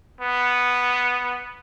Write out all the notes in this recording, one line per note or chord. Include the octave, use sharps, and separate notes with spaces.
B3